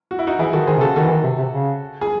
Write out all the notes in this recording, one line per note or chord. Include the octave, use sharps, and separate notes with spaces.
F#4
E4
D#4 F#4
E3 E4 G#4
D#3 F#4 A4
D#3 G#4 C5
C3
C#3 F#4 A4
D#3 F#4 A4
E3
D#3
C3
C3
C#3
G#4